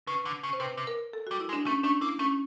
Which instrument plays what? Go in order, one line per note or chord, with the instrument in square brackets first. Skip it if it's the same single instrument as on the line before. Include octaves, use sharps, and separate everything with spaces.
[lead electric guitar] C#3 [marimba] B4
[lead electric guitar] D3
C#3
[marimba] C5
[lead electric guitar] C3 [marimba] B4
[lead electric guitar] C3
[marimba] A#4
A4
[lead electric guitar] G3 [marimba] F#4
[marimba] E4
[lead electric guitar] G#3
[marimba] D4
[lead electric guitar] A3 [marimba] C#4
[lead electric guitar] A3 [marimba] D4
[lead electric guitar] A#3 [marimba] E4
[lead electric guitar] A3 [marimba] C#4